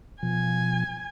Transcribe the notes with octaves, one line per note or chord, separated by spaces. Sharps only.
B2 F3 G#5